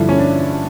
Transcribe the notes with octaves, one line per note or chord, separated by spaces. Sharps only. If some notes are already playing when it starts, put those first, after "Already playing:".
Already playing: G2 D3 F3 E4
C#4
D4